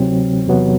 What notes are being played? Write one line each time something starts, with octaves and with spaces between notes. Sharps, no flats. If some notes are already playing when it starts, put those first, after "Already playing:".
Already playing: D2 C3 F#3 C4
E2 C3 F#3 B3